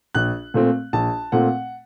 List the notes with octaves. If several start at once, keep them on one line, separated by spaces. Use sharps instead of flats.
A#1 F#6
A#2 A3 C4
A#1 A5
A#2 A3 C4 F#5